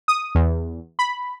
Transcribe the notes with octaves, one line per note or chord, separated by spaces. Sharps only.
D#6
E2
B5